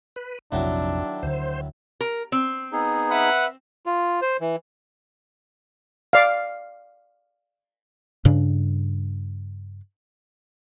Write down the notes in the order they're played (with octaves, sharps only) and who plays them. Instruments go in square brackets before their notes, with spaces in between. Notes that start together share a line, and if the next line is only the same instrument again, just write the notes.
[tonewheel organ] B4
[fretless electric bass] A#1 C3 [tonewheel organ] F2 [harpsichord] D#3 F#3 E4 [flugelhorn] D4
[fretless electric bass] D2 D3 [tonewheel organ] C5
[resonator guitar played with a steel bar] A#4
C4
[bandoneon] B3 D#4 G#4
[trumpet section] B4 E5 F#5
[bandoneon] F4
C5
E3
[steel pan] D5 F5
[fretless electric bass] G2 C#3 D4